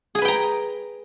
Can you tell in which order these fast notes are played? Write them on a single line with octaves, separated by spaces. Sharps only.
G#4 G#5 B4 G5 A#5